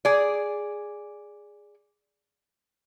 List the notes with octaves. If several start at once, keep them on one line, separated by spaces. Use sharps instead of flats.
G#4 D5